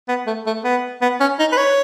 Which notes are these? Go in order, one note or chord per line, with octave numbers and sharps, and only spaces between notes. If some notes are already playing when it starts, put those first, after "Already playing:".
B3
A3
A3
B3
B3
C#4
D#4
B4
C#5